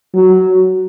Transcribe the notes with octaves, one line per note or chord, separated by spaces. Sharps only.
F#3